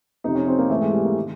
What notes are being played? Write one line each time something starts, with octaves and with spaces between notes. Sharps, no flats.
F2 C3 F3 D#4
C#4
C4
A#3
G#2 E3 A3
G#3
G3
A#3
C3 D#3 G#3